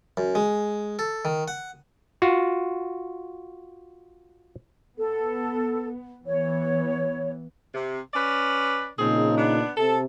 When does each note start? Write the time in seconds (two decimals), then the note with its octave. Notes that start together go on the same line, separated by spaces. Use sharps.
0.17 F#2
0.35 G#3
0.99 A4
1.25 D#3
1.48 F#5
2.22 F4 F#4
4.98 B3 A4
6.26 E3 B3 C#5
7.74 C3
8.14 C#4 B4 D5
8.99 A#2 C#3 F3 C4 D#4 G#4
9.38 B3 D4
9.77 C3 A4